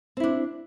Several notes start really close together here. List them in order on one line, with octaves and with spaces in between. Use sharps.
C4 E4 D4